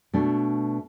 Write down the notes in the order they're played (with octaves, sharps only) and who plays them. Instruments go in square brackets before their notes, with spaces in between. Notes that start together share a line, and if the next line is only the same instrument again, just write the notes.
[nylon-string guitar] B2 A3 D4